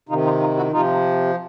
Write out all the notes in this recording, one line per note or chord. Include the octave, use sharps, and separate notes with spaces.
C3 D#3 D#4 F4
D#4 F4
D#4 F4
E4 F#4
C3 F3 D#4 F4